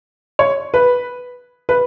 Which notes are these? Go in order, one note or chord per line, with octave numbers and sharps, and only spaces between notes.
C#5
B4
B4